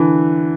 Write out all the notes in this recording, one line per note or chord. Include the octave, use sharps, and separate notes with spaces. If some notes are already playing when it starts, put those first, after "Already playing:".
Already playing: D3 E3